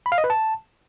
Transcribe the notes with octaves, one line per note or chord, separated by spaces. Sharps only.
B5
F5
D#5
B4
A5